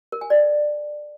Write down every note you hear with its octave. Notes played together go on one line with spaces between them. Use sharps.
A#4
G#5
D5